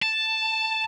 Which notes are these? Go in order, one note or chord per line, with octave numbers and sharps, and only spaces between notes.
A5